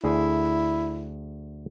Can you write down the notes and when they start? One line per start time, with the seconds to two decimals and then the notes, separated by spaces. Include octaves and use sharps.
0.04 D2 E4 G#4 A4